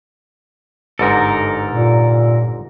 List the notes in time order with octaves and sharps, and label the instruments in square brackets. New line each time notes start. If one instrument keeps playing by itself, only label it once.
[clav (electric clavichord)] G1 G#2 D#4 [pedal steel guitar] A4 A#4
[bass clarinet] A#2